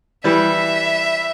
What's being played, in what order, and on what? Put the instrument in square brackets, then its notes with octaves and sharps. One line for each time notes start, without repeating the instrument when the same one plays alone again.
[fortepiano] E3 G3 [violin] E5